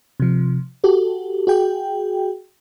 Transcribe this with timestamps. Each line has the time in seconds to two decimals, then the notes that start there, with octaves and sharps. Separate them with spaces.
0.20 C3 F3
0.84 F#4 G4 A4
1.47 F#4 G#4 G5